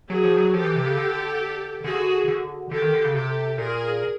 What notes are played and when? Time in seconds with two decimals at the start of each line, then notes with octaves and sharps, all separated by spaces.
0.10 F#3 F#4 G#4
0.24 F3
0.37 F#3
0.54 F3 G4 A4
0.64 E3
0.76 C3
0.86 C#3
0.97 D3
1.84 D3 F#4 G#4
2.28 D3
2.71 D3 G4 A4
2.82 D#3
2.94 D3
3.04 C#3
3.15 C3 G4 A4
3.58 A#2 G#4 A#4